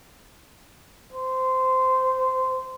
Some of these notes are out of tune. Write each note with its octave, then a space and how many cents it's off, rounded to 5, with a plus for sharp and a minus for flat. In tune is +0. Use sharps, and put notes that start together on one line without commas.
C5 -15